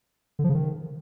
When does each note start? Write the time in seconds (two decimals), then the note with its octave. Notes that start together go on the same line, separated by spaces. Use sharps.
0.39 D3
0.44 F3
0.49 C#3
0.55 D#3